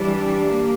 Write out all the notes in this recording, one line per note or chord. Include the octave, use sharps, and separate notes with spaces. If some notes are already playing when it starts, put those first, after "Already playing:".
Already playing: E3 G3 D4 G4
A#3